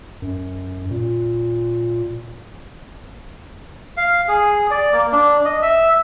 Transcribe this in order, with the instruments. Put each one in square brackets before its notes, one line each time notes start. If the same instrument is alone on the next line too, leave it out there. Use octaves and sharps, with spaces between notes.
[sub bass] F#2
A#2
[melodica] F5
G#4
D5
A#3
D4
D#5
E5